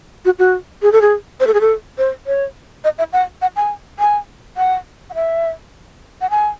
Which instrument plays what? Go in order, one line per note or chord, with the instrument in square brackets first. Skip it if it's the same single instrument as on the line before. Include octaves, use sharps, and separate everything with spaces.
[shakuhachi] F#4
F#4
G#4
A4
G#4
C5
A4
G#4
A4
C5
C#5
D#5
E5
F#5
F#5
G#5
G#5
F#5
F#5
E5
F#5
G#5